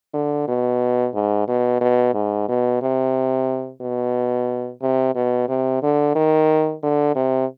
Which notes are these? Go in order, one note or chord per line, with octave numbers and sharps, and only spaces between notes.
D3
B2
G#2
B2
B2
G#2
B2
C3
B2
C3
B2
C3
D3
D#3
D3
C3